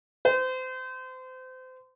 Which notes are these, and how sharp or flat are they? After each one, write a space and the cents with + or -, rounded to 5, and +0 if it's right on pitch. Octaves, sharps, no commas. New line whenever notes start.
C5 -30